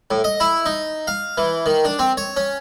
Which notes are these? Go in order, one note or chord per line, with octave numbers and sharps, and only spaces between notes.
A2
D#5
E4
D#4
F5
E3
D#3
D4
C4
C#5
C#4